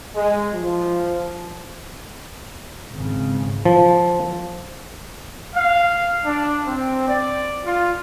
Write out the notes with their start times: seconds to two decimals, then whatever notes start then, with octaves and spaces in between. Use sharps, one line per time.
0.15 G#3
0.53 F3
2.92 G#1 C#3
3.65 F3
5.55 F5
6.25 D4
6.67 C4
7.08 D5
7.66 F4